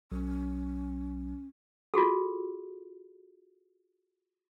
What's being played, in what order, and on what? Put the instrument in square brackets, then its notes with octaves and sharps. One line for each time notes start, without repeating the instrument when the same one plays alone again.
[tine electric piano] B1 F#3 [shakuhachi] C#4
[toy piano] F4 F#4 G#4 A4